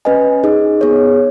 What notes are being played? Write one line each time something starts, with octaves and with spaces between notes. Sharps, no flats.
C#4 B4 D#5 G#5
D#4 G#4 D#5
B3 G#4 C#5